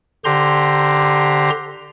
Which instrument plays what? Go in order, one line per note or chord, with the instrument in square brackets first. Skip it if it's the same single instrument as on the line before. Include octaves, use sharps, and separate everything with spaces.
[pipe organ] D3 G4 C5 A#5 C6